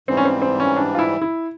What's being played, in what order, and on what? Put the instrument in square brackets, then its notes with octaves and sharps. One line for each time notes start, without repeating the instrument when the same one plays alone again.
[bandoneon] G#2 E3 G3 [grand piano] C4
[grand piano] C#4
C4
C4
C#4
D4
F4
E4
E4